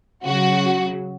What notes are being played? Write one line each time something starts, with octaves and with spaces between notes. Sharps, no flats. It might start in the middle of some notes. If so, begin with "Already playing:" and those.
C#3 F#3 F#4